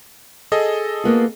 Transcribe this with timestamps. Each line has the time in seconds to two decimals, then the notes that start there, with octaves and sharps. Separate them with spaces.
0.52 G#4 A4 D#5
1.04 A#3 B3 F4